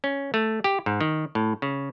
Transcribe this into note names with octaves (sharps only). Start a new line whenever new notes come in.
C#4
A3
G4
G#2
D#3
A2
C#3